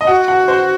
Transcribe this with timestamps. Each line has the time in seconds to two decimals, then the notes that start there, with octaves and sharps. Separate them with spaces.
0.01 D#5
0.07 F#4 F#5
0.28 F#5
0.48 C5